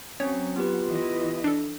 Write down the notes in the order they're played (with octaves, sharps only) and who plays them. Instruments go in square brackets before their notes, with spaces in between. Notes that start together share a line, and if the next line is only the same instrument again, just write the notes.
[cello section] F#3 [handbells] C4 C#4 [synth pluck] C#5
[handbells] B3 G4 B4 [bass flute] F4
[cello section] E3 E4 D#5
[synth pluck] D4 A4